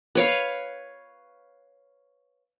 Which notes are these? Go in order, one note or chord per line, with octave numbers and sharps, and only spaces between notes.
B4 C#5 F5